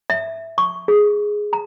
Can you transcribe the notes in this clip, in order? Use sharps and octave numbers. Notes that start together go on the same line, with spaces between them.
E5
C#6
G#4
A#5